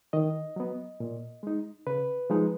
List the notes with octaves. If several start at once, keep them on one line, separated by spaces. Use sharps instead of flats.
D#3 D#5
F#3 B3
A#2
G#3 D#4
C#3 B4
F3 G#3 D#4